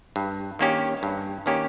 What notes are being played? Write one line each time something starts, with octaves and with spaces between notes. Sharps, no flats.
G2
D#3 A#3 C#4 G4
G2
D#3 A#3 C#4 G4